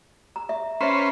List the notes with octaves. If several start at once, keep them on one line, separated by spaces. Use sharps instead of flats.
A#5
E5
C#4 B4 C5 E5 A#5